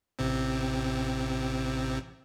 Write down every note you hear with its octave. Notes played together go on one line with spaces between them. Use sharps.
A1 C3 C4